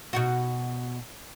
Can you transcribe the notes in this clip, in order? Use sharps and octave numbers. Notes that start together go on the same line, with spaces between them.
B2 D#4 F#4